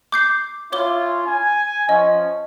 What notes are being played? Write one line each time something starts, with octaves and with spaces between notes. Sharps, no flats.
D6 G6 C7
C#4 E4 F4 C#5 D6 G7
G#5
F3 C#4 D#5